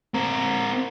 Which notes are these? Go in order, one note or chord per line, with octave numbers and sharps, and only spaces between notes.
C4 A#4